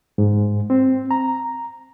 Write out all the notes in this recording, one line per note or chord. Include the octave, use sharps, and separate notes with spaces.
G#2
C4
A#5